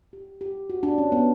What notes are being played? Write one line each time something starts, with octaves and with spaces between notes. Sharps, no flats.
G4
G4
F#4
D4
C#4
B3